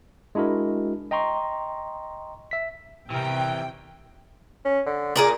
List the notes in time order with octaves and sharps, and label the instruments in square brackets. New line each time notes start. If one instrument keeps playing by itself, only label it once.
[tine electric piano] G#3 D4 E4 F#4 A#4
D#5 G5 A#5 C6 C#6
E5 B6
[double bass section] C3 [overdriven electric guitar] E3 A#4 [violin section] G5
[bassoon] C#4
D3
[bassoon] A#2 [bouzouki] G#4 A#4 D5